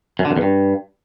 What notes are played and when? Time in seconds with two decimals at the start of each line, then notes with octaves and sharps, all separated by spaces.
0.19 F#2
0.25 D3
0.31 F#2
0.36 E2
0.42 G2